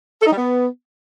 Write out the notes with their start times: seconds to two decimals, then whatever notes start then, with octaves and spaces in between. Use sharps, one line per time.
0.21 A4
0.26 D#4
0.32 G3
0.37 B3